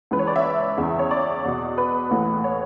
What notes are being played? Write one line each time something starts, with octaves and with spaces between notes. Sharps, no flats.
C#2 C#3 E3 B4
C#5
D5
E5
E2 C#3 E3
C#5
D5
E2 B2
B4
A1 A2 E3
C#5